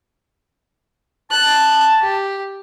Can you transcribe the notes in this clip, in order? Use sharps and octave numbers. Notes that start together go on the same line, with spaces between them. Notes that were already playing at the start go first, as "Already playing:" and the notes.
A5 F#6
G4